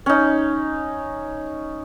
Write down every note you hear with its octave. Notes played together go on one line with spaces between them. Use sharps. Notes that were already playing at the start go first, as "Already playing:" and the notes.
C#4 D#4